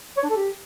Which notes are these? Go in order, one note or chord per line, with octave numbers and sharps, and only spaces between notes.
C#5
D4
A4
G4